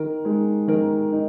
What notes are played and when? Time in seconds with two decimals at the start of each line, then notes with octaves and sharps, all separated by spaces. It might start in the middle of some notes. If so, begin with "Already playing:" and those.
Already playing: D#3 A#4
0.25 G#3 D#4
0.68 D#3 A#4
1.12 D#4